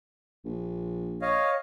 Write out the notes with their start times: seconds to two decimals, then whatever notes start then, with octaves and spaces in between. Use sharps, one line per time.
0.45 A#1
1.22 C#5 D#5 F5